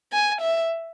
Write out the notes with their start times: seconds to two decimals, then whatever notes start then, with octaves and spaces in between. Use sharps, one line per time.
0.12 G#5
0.41 E5